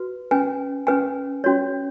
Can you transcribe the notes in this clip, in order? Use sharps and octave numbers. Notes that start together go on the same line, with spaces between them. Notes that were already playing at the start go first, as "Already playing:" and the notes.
Already playing: F#4 B4
C#4 B4 G#5
C#4 B4 G#5
C#4 F#4 C#5